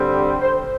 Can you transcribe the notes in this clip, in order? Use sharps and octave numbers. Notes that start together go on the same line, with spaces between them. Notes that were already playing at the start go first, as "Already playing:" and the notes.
Already playing: D3 G3 C4
G4
C5